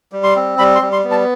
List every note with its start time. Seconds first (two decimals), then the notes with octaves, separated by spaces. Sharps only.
0.12 G3
0.24 C6
0.36 C4
0.58 G3 B5
0.75 C6
0.82 G3
0.93 C6
1.04 B3
1.11 A5